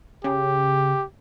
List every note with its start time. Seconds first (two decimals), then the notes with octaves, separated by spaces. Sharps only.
0.24 C#3 G4